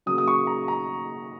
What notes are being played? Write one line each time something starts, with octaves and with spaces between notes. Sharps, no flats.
C#3 F#3 A#3 D#6
D#6
C#6
A#5
A#5